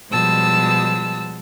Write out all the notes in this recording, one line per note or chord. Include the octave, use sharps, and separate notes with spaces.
B2 F3 G3 G#3 A5 E6